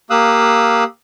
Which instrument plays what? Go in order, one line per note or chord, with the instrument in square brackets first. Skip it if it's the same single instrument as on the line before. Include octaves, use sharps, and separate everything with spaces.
[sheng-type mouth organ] A#3 G4 F5 D#6 E6 F#6